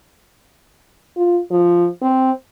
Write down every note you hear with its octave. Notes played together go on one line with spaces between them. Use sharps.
F4
F3
C4